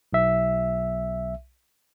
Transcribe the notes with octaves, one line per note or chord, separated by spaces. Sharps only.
B1 E5